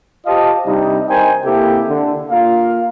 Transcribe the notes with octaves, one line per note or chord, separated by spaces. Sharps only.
F4 G4 C5 D#5 F5 A5
C3 G3 D4 D#4
D#4 A#4 C5 G5 G#5
C3 A#3 E4 G4 A4
D3
A#3 F4 A#4 F5